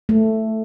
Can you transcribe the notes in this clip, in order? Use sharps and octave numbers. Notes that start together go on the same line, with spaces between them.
A3